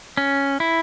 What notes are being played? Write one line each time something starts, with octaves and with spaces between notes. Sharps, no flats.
C#4
E4